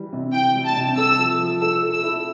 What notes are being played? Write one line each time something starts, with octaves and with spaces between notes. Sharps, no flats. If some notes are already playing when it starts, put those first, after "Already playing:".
Already playing: E3 G3
C3
E3 G5
G3
A5
C3
A4 E6
F3
F3
A4 E6
A4
E6
E4